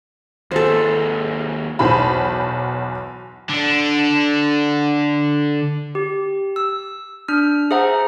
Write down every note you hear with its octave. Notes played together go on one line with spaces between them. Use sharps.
D#2 G#4 A4 C5
B1 E2 C5 A5 B5
D3 D4
G4
E6
D4 F6
G#4 C5 E5 F#5 A#5